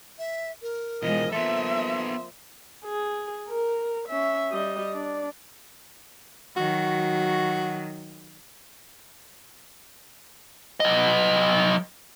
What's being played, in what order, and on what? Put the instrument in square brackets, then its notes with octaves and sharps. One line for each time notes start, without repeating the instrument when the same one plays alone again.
[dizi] E5
A#4
[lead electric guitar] B2 E3 [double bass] F3 G#3 [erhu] D#5
[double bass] F3 A#3 [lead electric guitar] B3 A4 [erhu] E5 [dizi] C6
[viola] G#4
A#4
C#4 E5
G3 D#5
D4 D5
[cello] D#3 F#3 [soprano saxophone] F#4
[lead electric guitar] F#3 D#5